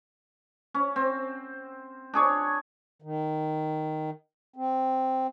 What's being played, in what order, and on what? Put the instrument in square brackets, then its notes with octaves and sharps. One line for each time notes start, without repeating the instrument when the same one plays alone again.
[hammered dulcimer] C#4
C4
D4 G#4 C#5
[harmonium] D#3
C4